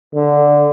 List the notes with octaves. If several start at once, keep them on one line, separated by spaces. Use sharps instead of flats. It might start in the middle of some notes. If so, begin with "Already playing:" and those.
D3